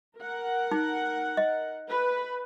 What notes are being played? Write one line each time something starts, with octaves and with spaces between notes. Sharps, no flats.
A#4 F#5
D#4
D#5
B4